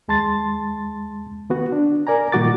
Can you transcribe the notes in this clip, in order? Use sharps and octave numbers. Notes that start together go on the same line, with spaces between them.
D#2 G#3 A5 C6 A6
D#3 B3 F#4
D4
A#4 D5 G#5 A#5
A#2 D#3 G3 F#4 D6 A6